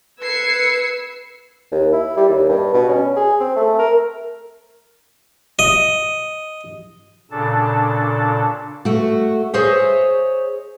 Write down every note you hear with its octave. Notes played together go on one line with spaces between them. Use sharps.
B4 E6 G#6 C7 C#7
D#2
E4
G3
D#2
G2
B2
C#4
G#4
C4
A3
A#4
D#5
A#2 C#3 D4 A4 A5
A3 F#4
G#4 C5 C#5 D#5 E5